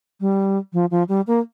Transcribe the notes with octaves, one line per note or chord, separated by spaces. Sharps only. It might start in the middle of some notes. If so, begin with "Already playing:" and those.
G3
F3
F3
G3
A#3